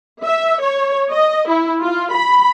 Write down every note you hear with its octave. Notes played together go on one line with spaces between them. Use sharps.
E5
C#5
D#5
E4
F4
B5